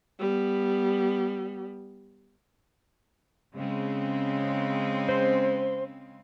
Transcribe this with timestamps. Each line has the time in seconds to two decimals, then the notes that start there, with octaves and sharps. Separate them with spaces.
0.20 G3 B3
3.55 C#3 G#3 C4
5.09 C5